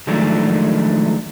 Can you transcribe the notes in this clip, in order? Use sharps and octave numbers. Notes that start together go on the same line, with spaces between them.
D#3 F3 F#3 G#3 A3 D4